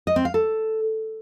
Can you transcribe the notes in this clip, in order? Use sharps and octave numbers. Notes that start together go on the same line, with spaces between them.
D#5
C4
F5
A4